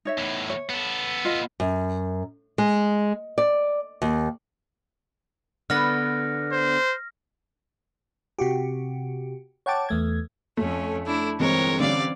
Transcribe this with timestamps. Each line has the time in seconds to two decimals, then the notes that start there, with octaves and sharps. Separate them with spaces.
0.05 D#4 C#5 E5
0.18 E2 A2
0.50 C#5
0.69 B3 A4
1.25 F4 D#5
1.60 F#2
2.58 G#3
3.38 D5
4.02 D#2
5.70 D3 B3 B4 F6 A#6
6.52 C5
8.39 C3 F#4 G4
9.66 C#5 F#5 G5 A5 D6
9.89 E2 A3 G#6
10.57 F2 A3 C#4
11.06 D4 E4
11.40 G1 E3 G#3 C4 A#4 C#5
11.80 D3 G3 C#4 D5 F5 D6